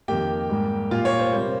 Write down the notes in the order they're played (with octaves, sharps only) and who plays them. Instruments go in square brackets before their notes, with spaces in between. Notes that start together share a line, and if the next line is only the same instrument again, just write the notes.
[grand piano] F2 D#3 A#3 G4 G5
G#2 G3 A#3
A#2 G3 A#3 F4 F5
C#5
C5
C3 G3 A#3 C5